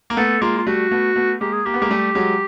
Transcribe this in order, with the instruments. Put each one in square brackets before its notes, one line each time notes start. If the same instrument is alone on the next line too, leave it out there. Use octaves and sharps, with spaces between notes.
[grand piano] A#3
[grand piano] A3 B3 [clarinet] A4
[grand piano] G#3 A#3 [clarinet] F4
[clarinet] F4
[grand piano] G3 A3 [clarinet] F#4
[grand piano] A3 B3
A3 B3
[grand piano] G#3 A#3 [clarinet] G4
[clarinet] G#4
[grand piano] A#3 [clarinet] G4
[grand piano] B3
G#3 A#3
G3 A3
F#3 G#3